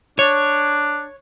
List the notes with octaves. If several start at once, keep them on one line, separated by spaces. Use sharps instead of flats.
D4 C#5